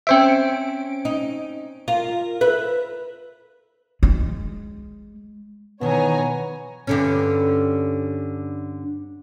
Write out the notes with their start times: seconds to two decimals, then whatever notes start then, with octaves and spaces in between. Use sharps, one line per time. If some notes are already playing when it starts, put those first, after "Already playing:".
0.07 C4 C#4 C5 E5 D7
1.05 D#4
1.88 F4 A#4
2.41 B4 E5
4.03 G#3
5.81 B2 D#3 E3 B3 C#5 G#5 A#5
6.87 G2 D3 C#4